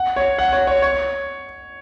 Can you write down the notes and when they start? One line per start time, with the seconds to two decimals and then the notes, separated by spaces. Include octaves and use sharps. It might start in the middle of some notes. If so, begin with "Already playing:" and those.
Already playing: F#5
0.16 C#5
0.38 F#5
0.53 C#5
0.67 C#5
0.82 C#5